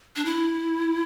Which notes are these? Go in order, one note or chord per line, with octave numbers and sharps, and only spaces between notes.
D4
E4